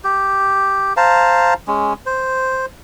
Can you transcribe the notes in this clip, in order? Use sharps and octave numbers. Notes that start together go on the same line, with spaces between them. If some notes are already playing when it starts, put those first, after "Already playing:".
G4
C5 F5 A5 A#5
G#3 C#4
C5